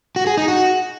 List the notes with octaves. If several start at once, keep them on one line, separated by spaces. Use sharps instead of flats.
F#4
G#4
D#4
F#4